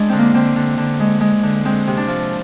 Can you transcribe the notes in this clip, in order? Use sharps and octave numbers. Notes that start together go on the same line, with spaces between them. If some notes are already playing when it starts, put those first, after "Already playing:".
Already playing: G#3 D4
D3 C4
A#3
D3 C4
D3
D3
G#3
G#3
D3
G#3 C4
C3
D4
F3